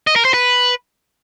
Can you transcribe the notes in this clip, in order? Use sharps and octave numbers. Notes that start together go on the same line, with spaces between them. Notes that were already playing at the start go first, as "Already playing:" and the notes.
D#5
A#4
C5
B4